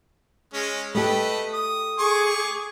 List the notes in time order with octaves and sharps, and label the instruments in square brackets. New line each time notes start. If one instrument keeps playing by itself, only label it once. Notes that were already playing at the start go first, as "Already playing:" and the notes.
[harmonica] G#3 C#4
[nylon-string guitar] A3 G4 [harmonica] A4 B4 D#5
[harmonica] D#6
[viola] G#4 [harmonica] C#6 D6